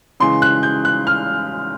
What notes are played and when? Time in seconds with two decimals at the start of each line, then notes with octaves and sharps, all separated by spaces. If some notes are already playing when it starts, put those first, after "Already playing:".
0.20 C#3 E3 G#3 C6
0.42 F#6
0.63 G6
0.85 F#6
1.07 F6